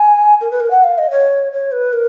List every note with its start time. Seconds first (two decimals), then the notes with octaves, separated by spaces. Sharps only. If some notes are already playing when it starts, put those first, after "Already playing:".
Already playing: G#5
0.41 A#4
0.51 B4
0.60 A#4
0.71 F#5
0.84 F5
0.98 D#5
1.11 C#5
1.52 C#5
1.72 B4
1.93 A#4